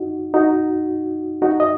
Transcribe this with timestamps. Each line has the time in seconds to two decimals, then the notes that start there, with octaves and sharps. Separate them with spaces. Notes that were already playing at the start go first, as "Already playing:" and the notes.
Already playing: D#4 F#4
0.34 D#4 F#4
1.42 D#4 F#4
1.60 D#5